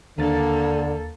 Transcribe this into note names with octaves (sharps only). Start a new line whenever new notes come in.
D#2 D3 A#3 D4 A4 A6